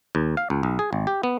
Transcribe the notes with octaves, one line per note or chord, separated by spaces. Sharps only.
D#2
F5
C#2
B1
G#4
G#1
G4
B3